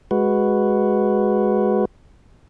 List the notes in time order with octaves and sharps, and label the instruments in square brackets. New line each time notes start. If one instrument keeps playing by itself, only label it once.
[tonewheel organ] G#3 F#4 B4